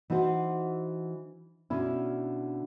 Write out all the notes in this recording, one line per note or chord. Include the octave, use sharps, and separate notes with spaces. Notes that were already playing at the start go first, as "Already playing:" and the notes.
E3 D#4 F#4 C5
B2 D3 C#4 E4